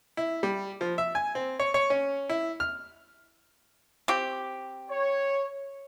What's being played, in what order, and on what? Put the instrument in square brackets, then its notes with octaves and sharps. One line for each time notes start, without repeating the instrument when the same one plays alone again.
[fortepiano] E4
G3
F3
E5
G#5
C4
C#5
C#5
C#4
E4
F6
[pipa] C4 G4
[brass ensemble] C#5